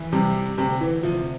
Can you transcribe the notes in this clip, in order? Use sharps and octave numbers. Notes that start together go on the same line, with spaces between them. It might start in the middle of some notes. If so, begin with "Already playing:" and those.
Already playing: E3
C3 G3
D2 C3
E3
C3 F3